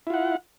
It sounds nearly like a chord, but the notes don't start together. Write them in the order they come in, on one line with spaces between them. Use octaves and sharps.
E4 F4 F#5